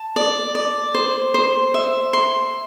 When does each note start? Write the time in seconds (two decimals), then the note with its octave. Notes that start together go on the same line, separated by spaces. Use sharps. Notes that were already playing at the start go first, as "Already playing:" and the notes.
Already playing: A5
0.16 D5
0.55 D5
0.95 C5
1.34 C5
1.74 E5
2.13 C6